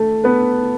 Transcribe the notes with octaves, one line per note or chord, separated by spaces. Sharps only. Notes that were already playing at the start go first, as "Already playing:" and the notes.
Already playing: A3 A4
B3 B4